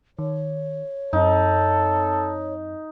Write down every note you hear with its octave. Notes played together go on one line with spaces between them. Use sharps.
D#3 C#5
F#2 C4 D#4 A4